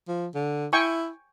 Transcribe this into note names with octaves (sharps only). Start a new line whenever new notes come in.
F3
D3
E4 G5 G#5 C#6